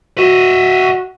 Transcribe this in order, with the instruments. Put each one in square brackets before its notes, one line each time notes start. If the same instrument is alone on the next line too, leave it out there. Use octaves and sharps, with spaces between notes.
[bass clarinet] F#4 [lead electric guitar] D#5 E5